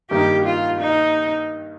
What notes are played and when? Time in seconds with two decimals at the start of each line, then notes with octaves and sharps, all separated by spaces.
0.11 G2 D#3 G3 A#3 D#4 G4
0.46 F4
0.81 D#4